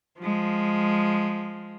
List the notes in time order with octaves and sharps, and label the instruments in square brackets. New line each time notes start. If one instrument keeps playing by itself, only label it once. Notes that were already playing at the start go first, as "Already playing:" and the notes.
[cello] F3 G#3